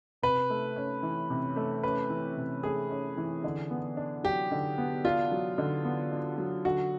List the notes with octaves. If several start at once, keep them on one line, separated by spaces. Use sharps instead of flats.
C3 B4
A3
C#4
E3
C3
A3
C#4 B4
E3
C3
A3 G#4
C#4
E3
D3
B3
D4
F#3 G4
D3
B3
D4 F4
F#3
D3
B3
D4
F#3
D3 F#4